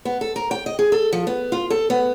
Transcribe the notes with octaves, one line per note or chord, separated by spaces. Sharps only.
B3
A4
A#4
G5
D#5
G#4
A4
F3
B3
F4
A4
B3